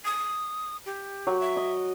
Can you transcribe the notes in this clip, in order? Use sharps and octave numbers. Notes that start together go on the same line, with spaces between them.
D#6
G4
F#3
E5
D#5